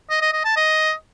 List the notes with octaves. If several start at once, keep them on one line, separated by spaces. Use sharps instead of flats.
D#5
D#5
D#5
A5
D#5